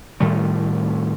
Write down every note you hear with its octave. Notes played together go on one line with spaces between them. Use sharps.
A2 D#3 G3 A3